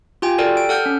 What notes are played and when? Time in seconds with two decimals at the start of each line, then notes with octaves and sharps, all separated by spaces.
0.22 F4 G4 G5 G#5
0.38 F#4 G4 A4 A#4 D5 G5
0.57 D7
0.69 A4 F#5 F6 G6
0.86 C#4